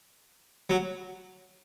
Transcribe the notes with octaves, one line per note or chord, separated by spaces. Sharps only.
F#3